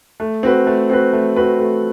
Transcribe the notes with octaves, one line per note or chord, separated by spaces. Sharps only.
A3
C4 F#4 B4
A3
C4 F#4 B4
A3
C4 F#4 B4
A3